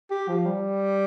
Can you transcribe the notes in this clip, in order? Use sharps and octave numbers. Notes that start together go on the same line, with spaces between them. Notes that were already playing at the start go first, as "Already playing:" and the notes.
G4
F3
G3